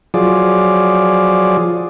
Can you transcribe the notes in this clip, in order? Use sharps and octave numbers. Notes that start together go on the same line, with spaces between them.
F3 F#3 F4 G#4 D5